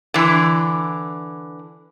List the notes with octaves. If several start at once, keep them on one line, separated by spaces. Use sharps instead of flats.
D3 E3